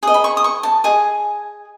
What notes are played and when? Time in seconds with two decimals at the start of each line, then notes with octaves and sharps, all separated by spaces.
0.03 G#4 D#5 D#6
0.14 B5
0.24 C#6
0.37 D#6
0.44 C#6
0.63 A5
0.84 G#4 D#5 G#5